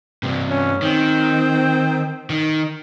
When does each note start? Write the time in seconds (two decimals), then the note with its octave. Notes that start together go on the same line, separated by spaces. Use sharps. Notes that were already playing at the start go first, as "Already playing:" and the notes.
0.23 G2 C3
0.49 C#4
0.82 D#3 C4
2.30 D#3